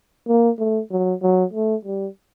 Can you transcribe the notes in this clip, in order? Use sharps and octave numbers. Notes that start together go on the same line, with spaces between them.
A#3
A3
F#3
F#3
A3
G3